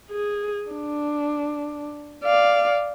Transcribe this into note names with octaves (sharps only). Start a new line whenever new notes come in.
G#4
D4
D5 F5